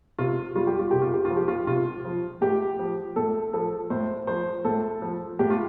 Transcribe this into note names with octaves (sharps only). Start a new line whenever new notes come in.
C3 F4
G3 F4
G4
F4
C3 G4
F4
G4
F4
F3
G4
F4
C3 F4
F3
A2 G4
F3
A2 A4
F3 A4
A2 C5
F3 C5
A2 A4
F3
A2 G4
F4